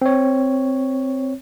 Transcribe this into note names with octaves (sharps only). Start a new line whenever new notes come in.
C4 C#5